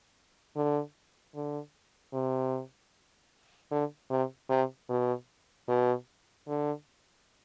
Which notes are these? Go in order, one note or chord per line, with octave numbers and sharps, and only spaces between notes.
D3
D3
C3
D3
C3
C3
B2
B2
D3